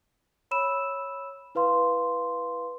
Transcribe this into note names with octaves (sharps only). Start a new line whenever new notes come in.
C#5 B5 E6 E7
E4 B4 F5 C6